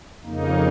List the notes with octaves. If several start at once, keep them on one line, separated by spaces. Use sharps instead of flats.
F2 C#3 A#3 D#4